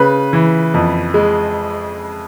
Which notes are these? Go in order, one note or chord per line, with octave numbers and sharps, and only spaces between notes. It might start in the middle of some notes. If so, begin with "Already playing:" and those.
Already playing: C#3 B4
E3
F2
G#3